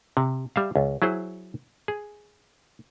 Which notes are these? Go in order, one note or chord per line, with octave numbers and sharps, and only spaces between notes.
C3
G3 E5 F5
C#2
F#3 E4 G#4 C5
G#4